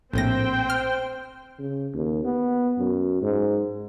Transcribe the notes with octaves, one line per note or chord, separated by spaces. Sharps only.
A#1 A2 C4 C5 G5 A#6
F6
C#3
D#2
B3
F#2
G#2